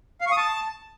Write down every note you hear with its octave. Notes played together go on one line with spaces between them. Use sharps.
F5
C#6
D#6
A5